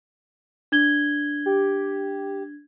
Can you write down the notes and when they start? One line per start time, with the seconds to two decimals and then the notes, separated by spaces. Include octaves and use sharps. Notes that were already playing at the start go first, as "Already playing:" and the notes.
0.72 D4 G#6 G7
1.46 G4